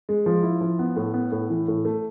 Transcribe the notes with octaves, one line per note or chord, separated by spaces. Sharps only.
G#3
F3
E4
F3
B3
A2
B3
A2
E3
A2
A3